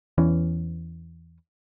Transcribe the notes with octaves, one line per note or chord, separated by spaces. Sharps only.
E2 E3 C#4